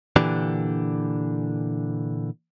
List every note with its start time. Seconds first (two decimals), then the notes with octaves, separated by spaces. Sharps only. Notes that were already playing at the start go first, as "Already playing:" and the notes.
0.16 A#2 D3 E3 D4 G4